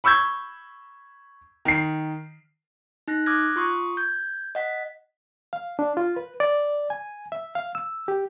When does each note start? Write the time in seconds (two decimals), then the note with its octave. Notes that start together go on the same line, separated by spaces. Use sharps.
0.04 B5 C#6 E6 G6 G#6
1.65 D#3 C7
3.08 D#4 F#6 A#6
3.26 D6 D#6 F6 F#6 G#6 A#6
3.56 F4 C6 C#6 D#6
3.97 G6 G#6
4.55 D#5 F#5 B6
5.53 F5
5.79 D4
5.97 F4
6.16 B4
6.40 D5
6.90 G#5
7.32 E5
7.55 F5
7.75 E6
8.08 G4